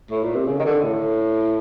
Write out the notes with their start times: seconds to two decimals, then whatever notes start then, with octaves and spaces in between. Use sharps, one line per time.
0.11 A2
0.23 A#2
0.35 C3
0.47 C#3
0.59 D#3
0.66 D3
0.83 A2